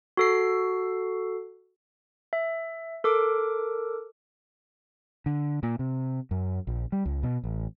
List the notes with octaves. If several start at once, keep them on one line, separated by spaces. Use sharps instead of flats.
F#4 A4 C7
E5
A4 A#4 D6
D3
A#2
C3
F#2
A#1
G3
C#2
B2
A1